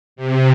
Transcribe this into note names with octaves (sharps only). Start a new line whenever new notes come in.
C3